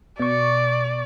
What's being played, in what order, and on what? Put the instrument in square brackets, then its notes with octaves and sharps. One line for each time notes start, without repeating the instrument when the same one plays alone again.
[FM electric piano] B2 C#6 [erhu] D5